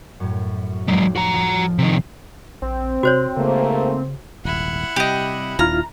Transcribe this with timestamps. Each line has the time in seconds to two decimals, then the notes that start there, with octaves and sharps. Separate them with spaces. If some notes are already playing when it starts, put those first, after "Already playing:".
0.20 F#2 A2
0.88 F1 F#3 G#3
1.16 F#4 A#5
1.34 F3 F4
1.79 C3 D#3 C7
2.62 A#1 C4
3.03 C3 F#4 C5 C#5
3.37 G#2 C#3 A3 A#3
4.45 D#1 G#1 E4 F#5
4.96 C3 G3 G4 D#5
5.59 D#1 D#2 D4 E4 F4 A#5 F6